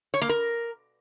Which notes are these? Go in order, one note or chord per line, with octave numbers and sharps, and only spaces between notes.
C#5
A#3
A#4